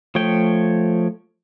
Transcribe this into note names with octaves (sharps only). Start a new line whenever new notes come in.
F3 A3 C#5 G5